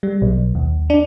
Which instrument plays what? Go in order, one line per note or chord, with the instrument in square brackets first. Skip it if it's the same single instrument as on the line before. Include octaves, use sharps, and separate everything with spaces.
[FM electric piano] G3
B1
D#2
D4